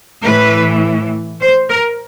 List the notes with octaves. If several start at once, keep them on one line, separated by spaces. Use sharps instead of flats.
A2 E3 B4
C5
A#4